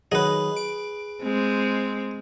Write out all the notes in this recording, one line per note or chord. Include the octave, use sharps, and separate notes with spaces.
D#3 F#3 G#4 B4 D#5
D7
G#3 C4